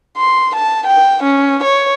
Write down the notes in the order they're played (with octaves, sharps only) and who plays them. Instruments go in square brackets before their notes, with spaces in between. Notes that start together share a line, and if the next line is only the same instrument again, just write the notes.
[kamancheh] C6
A5
G5
C#4
C#5